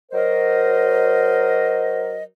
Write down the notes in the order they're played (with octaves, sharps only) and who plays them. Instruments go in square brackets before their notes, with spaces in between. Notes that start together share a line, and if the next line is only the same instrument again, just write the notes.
[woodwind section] F#3 A#4 C5 D#5